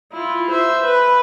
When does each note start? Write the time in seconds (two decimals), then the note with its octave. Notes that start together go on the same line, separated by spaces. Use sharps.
0.13 E4 F4
0.50 C5 E5
0.84 B4